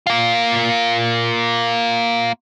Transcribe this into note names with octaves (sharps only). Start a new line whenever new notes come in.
A#3 F4